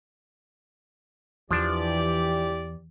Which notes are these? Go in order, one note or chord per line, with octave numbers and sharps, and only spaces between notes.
E2 E3 F3 D4 G4 D5